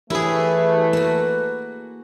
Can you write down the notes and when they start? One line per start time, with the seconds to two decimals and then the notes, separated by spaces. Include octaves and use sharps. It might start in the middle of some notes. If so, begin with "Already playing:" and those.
0.10 E3 A3 E4 G4 G#4 A#4 B4 C#5
0.93 A#3 F#4